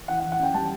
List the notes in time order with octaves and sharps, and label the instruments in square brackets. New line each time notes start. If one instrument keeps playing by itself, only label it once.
[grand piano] E3 F#5
F#5
E3
F#5
C#4 G5
G3 A5